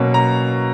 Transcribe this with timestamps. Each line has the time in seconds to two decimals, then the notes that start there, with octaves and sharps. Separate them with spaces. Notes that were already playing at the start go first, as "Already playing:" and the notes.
Already playing: B2 F#3 A#3 C#4
0.14 A#5